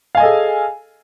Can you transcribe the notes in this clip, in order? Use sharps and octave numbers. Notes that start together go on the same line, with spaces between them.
G#4 A4 D#5 F5 G#5